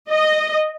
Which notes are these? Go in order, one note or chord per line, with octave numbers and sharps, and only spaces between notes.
D#5